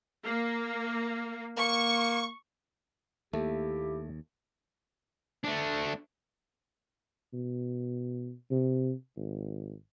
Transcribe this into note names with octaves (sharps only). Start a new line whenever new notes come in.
A#3
A#3 C#6
D#2 A3 A#3 E4 G4
A3 D4
B2
C3
G#1